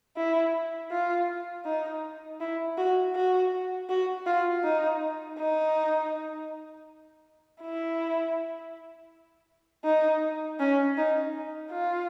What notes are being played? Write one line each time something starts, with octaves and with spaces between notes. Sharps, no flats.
E4
F4
D#4
E4
F#4
F#4
F#4
F4
D#4
D#4
E4
D#4
C#4
D#4
F4